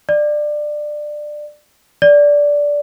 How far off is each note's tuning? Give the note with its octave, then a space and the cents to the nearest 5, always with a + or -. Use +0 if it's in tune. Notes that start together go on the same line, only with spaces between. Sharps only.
D5 +20
D5 -10